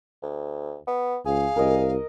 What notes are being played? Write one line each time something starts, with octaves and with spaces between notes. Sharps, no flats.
D2
B3
C#2 G#4 F5
C2 A#4 D#5